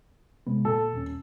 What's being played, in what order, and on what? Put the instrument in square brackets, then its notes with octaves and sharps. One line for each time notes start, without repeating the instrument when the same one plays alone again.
[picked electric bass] C3 G#3 B3
[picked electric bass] A#2 [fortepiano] A4
[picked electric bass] D#1 C#4